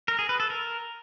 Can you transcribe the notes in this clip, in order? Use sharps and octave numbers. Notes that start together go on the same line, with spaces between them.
A#4
G#4
B4
A4
A#4